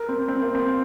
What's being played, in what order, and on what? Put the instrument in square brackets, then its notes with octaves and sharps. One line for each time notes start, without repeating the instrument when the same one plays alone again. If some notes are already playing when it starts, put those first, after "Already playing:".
Already playing: [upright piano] A#4
C4
C4
A#3
C4